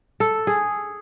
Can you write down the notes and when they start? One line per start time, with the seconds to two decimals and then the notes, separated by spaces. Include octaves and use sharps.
0.20 A4
0.47 G#4